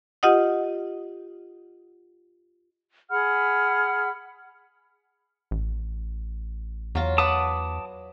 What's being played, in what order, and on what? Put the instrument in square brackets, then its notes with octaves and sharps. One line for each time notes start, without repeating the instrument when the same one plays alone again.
[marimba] F4 G4 D#5 F#5 D#6
[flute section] G#4 F#5 B5 F6
[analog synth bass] A1
[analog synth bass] E2 [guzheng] F#3 F4
[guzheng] B4 F#5 [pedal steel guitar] A5 D6 D#6